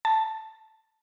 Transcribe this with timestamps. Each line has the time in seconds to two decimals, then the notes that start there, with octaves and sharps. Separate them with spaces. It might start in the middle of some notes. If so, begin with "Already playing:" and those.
0.05 A5